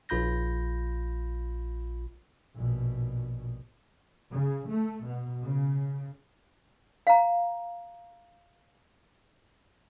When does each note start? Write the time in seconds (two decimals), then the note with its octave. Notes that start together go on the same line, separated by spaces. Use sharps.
0.09 A#1 F4 B5 G6 A#6
2.55 A#1 B2
4.31 C#3
4.69 A3
5.05 B2
5.43 C#3
7.07 F5 A#5